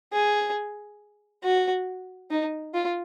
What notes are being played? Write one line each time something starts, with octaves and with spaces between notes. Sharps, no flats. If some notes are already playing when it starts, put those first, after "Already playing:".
G#4
F#4
D#4
F4